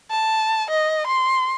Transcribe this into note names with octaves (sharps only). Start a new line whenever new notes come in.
A5
D#5
C6